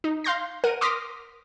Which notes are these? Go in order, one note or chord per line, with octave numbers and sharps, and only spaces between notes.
D#4
F5 C6 G6 A#6
A#4 F#5 D#7
C6 D6 D#6 F6 A#6 B6